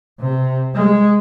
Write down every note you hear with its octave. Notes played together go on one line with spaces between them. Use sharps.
C3
G#3